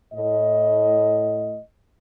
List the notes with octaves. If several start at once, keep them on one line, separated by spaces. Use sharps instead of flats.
A2 D#5